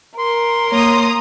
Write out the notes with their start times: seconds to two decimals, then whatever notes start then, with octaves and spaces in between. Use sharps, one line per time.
0.19 A#4 C6
0.70 A#3 C#5 A#5 D#6